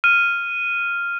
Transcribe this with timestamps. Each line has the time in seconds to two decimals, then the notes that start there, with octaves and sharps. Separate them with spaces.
0.04 F6 D#7